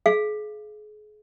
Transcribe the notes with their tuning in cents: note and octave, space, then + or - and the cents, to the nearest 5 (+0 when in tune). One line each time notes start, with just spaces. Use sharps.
G#4 +35 F5 -40